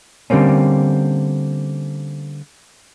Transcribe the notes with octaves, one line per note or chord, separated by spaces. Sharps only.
D3 G3 A#3 C4 C#4